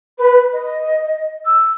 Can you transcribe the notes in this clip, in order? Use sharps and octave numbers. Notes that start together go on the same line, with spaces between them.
B4
D#5
E6